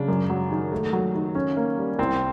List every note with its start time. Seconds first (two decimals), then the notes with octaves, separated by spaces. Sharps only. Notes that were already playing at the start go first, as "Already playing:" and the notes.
Already playing: C#3 F#3 D4
0.08 F#2
0.30 F#3
0.50 D#3
0.72 A3
0.93 F#3
1.15 D#3
1.35 C#4
1.57 A#3
1.77 G3
1.99 C2 C4